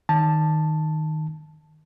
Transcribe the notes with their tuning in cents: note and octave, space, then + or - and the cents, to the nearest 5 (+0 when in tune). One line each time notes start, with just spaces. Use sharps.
D#3 +0 A5 +0